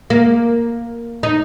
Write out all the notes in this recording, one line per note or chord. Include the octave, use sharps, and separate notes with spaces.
A#3
D#4